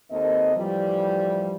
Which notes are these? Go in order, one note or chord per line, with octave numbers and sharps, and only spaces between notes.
D#2 A#3 C4 A4 D#5
A2 E3 F3 G3